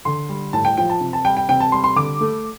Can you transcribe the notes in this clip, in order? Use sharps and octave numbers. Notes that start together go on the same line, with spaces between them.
D3 C6
G3
A2 A5
G5
F3 G5
A5
C3
A5
G3 G5
G5
C3 G5
A5
G3 C6
C6
D3 D6
A3